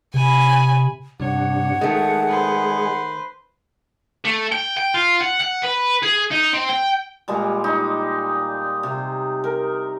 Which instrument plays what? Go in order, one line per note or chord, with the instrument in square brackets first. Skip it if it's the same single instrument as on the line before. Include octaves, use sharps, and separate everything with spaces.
[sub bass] C3 [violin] G#5 B5
[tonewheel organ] G2 C3 D4 [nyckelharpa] C#5 [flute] F#5
[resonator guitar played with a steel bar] D#3 A3 [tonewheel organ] G#3 G#4
[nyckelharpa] B4 C5
[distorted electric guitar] A3
G5
G5
F4
F#5
F#5
B4
G#4
D#4
C4
G5
[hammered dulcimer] A#2 G3 G#3 A#5
D#4
C3
A#4